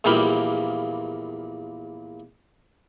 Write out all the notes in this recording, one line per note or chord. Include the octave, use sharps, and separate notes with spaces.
A#1 E2 A#2 G3 F5 B5